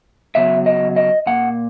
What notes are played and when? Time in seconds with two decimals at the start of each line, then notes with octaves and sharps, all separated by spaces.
0.35 C#3 F#3 B3 E5
0.66 D#5
0.96 D#5
1.26 A#2 A#3 F#5